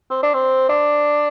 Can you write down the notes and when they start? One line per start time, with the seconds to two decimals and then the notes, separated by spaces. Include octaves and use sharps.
0.11 C4
0.23 D4
0.34 C4
0.69 D4